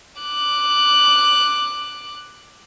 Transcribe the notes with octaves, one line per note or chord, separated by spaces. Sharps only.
D6 F#6